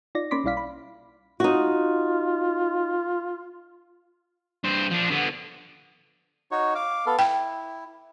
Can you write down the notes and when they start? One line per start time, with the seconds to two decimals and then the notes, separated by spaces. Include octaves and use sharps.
0.15 D#4 F4 D5 A#6
0.31 A#3 C#4 B5 C6 D6 B6
0.44 B1 G3 E4 D5 F5 B6
0.57 B5
1.40 D#4 F4 F#4
4.64 G2 C5
4.91 F3 D4
5.11 D3 B3
6.51 D#4 F#4 C#5
6.75 F5 D6
7.06 B3 A4 F5
7.19 E4 G5